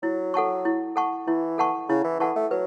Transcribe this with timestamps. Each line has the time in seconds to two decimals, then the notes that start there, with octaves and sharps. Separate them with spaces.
0.03 F#3 E4
0.34 A4 F#5 A5 C#6
0.65 E4
0.96 A4 F#5 A5 C#6
1.27 E3 E4
1.58 A4 F#5 A5 C#6
1.89 C#3 E4
2.04 E3
2.20 E3 A4 F#5 A5 C#6
2.36 A3
2.51 F#3 B4